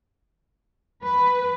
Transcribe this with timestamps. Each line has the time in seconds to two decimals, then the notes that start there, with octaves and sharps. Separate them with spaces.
1.04 B4